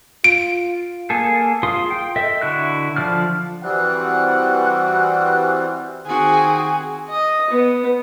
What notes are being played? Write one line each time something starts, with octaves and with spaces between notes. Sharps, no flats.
F4 D7
A#3 G#4 A4
F4 G#4 F5 C6 D#6
G5
A4 D#5 E5
D3 E4 F#4 F#6
D3 F3 D5 F6
E3 G3 C4 F#4 F#5 F#6
D#3 C4 F#4 G#4
D#5
B3